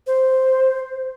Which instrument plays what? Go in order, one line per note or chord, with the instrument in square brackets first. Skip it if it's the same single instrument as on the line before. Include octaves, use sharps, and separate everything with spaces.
[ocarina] C5